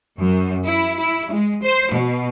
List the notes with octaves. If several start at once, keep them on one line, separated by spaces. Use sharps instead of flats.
F#2
E4
E4
G#3
C5
B2